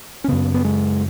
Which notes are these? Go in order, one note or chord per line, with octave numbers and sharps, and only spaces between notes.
C#4
F#2 C#3 B3
B3
G#3